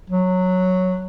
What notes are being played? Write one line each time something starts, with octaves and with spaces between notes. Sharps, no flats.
F#3